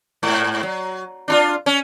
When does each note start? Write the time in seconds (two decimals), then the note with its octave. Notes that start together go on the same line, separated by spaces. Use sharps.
0.23 G#2
0.63 F#3
1.28 D4 D#4 F4
1.66 C#4